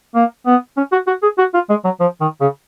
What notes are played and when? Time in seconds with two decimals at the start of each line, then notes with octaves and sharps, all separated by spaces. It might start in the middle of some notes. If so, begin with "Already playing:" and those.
0.15 A#3
0.46 B3
0.77 C#4
0.92 F#4
1.07 F#4
1.23 G#4
1.38 F#4
1.54 F4
1.69 G#3
1.84 F#3
2.00 F3
2.20 D#3
2.41 C#3